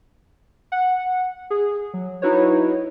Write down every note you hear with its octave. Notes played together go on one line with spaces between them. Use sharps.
F#5
G#4
F#3
D#4 E4 F#4 B4 C#5